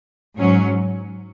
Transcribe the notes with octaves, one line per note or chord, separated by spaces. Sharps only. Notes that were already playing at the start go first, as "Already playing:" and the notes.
G#2 F#3 C#4